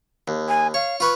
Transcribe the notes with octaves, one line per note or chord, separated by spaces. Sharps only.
D#2
G#5
C#5 F5
F4 B4 C#6